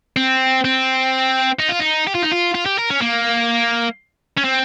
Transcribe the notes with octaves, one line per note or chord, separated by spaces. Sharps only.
C4
C4
D#4
F4
D#4
G4
F4
D#4
F4
F4
G4
A#4
C#4
A#3
C#4
C4